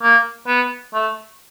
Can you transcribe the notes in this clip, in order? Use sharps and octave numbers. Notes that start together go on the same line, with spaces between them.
A#3
B3
A3